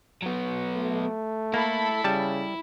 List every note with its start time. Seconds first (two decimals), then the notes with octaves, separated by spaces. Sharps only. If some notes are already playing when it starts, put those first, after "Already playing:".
0.22 F#3 B3
0.76 A3
1.54 A#3 E4 A4 B5
2.04 C#3 G3 A5